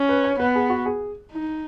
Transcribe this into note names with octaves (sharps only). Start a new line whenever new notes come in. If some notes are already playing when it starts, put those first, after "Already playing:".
Already playing: C#4
B4
C#5
B3 B4
G#4
F#4
G#4
D#4